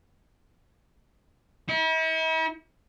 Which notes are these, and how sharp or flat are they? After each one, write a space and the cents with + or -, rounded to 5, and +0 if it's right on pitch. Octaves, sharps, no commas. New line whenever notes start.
E4 -45